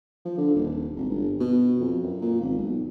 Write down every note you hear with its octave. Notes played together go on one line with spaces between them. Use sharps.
F3
D3
D#1
G#1
G1
B2
F2
F#2
A#2
G#1
B1